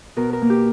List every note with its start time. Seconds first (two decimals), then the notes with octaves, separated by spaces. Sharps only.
0.17 B2 A#4
0.33 A#4
0.42 A#3
0.50 G4